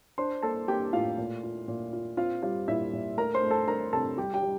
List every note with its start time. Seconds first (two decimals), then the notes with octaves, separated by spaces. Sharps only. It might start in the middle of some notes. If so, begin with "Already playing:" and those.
0.18 D4 C5 C6
0.43 A#3 A4 A5
0.68 A#3 G4 G5
0.93 A2 F4 F5
1.18 A#2
1.43 F4
1.68 A#2
1.93 F4
2.17 C4 F4 F5
2.43 G3 F4 F5
2.68 A#2 E4 E5
2.93 A#2
3.17 A3 A#4 A#5
3.34 C5 C6
3.43 A3
3.51 A4 A5
3.67 D4 A#4 A#5
3.93 C3 A4 A5
4.17 G3 G4 G5
4.34 G4 G5
4.43 G3